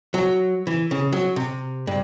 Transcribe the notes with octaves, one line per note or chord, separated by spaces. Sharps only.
F#3
E3
C#3
F#3
C3
G2